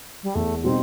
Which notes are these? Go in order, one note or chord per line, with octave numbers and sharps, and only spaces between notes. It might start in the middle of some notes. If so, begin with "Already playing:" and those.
G3
E2 A3
B2 G3 C4 D#4